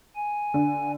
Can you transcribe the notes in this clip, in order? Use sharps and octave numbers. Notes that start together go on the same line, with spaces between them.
G#5
D3